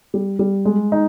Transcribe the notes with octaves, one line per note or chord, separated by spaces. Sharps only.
G3
G3
G#3
D#4